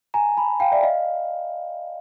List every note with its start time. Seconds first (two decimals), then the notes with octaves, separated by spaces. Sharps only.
0.14 G#5 A#5
0.37 A5 B5
0.60 F5 G5
0.72 D5 E5
0.83 D#5 F5